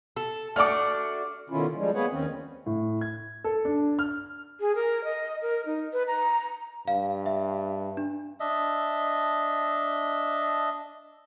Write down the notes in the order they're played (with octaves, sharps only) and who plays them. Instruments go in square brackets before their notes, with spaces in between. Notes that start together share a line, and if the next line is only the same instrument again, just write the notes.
[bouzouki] A4
[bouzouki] A3 D4 F#4 [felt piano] D6 F6
[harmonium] B2 D3 D#3 C#4 E4 F4
F3 G3 G#3
A#3 B3 G#4 B4 C#5 F#5
D#2 D#3 C4 C#4
[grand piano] A2
G#6
A4
D4
F6
[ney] G#4
A#4
D#5
A#4
D#4
B4
A#5
[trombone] G2 [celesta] F5
[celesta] E5
D4
[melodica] D4 D#5 E5